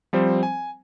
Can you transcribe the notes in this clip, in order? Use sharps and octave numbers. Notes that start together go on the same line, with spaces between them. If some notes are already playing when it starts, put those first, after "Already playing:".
F3 G3 C4 C5
G#5